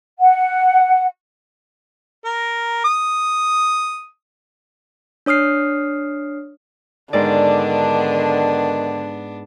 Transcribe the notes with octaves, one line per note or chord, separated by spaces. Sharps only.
F#5
A#4
D#6
D4 C#5 D#6 F6 C7
G#2 D3 D#3 B3 D4 D5